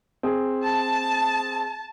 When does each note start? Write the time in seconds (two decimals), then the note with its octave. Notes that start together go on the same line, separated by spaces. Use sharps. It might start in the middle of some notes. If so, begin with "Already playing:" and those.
0.23 C4 G#4
0.63 A5